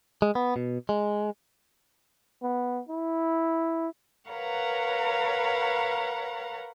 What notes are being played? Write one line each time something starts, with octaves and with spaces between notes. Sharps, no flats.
G#3
B3
B2
G#3
B3
E4
A#4 B4 C#5 F5 F#5 A#5